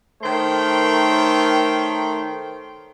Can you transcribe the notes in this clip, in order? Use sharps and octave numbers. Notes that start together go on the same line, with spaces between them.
D#3 A3 A#4 C5 C#5 G5